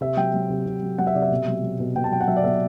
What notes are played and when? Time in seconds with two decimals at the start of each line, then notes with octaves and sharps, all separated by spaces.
0.01 C3 E5
0.17 F#3 G5
0.34 F#3
0.50 C3
0.66 C3
0.82 F#3
0.98 F#3 F#5
1.07 E5
1.15 C3 D5
1.22 E5
1.31 B2
1.48 F#3
1.63 F#3
1.80 B2
1.96 B2 G5
2.04 A5
2.11 F#3 G5
2.21 F#5
2.27 F#3 E5
2.37 D5
2.44 B2 E5